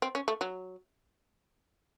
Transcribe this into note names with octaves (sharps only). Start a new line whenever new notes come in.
C4
C#4
A3
F#3